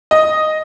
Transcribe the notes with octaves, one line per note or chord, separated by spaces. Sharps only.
D#5